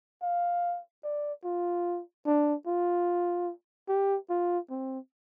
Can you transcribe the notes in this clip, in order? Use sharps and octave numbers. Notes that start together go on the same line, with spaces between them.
F5
D5
F4
D4
F4
G4
F4
C4